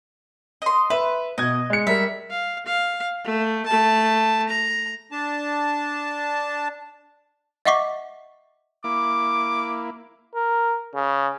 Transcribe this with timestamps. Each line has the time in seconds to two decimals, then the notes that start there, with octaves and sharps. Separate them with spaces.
0.62 D#5 C6
0.90 B4 E5
1.38 B2 D#5 G#6
1.70 G#3 C#7
1.87 G3 A#4 E5
2.30 F5
2.66 F5
3.24 A3
3.66 A3 A5
4.49 A#5
5.12 D4 A5
7.65 D#5 E5 F#5 C#6 D6 B6
8.84 A#3 E4 D6
10.35 A#4
10.95 C#3